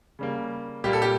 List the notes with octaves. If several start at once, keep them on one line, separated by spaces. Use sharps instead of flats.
C#3 G3 A#3
A#2 G3 A#3 G4
A4
G4